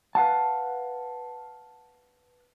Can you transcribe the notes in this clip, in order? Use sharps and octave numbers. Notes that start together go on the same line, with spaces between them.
B4 F5 F#5 A5